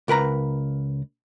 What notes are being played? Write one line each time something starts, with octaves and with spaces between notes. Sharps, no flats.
C#2 A#4 B4 A#5